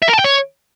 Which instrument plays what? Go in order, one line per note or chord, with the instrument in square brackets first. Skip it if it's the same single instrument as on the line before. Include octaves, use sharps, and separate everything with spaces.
[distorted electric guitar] E5
A#4
A5
G5
C#5